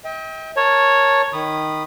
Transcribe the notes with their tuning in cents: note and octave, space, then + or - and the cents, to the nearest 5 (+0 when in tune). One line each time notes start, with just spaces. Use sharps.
D#5 +45 G5 +15
A#4 +0 C#5 -5 A5 +0
D#3 +0 B5 +0 D#6 -20